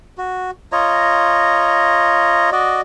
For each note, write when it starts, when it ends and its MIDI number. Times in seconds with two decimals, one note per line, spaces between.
0.18 0.51 66
0.72 2.50 65
0.72 2.50 73
0.72 2.50 75
0.72 2.50 82
2.52 2.81 66
2.52 2.81 74
2.52 2.81 75